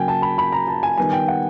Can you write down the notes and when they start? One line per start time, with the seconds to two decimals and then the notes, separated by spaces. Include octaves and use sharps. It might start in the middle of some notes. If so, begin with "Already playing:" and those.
Already playing: C#3 F#3 A#3 G5 G#5
0.08 A5
0.22 B5
0.38 B5
0.52 A#5
0.68 A5
0.83 G#5
0.98 D#3 G3 B3 G#5
1.12 G5
1.28 F#5